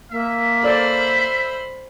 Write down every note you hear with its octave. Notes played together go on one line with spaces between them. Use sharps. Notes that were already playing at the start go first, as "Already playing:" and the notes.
A#3 E5
A4 C5 D5 B5 E6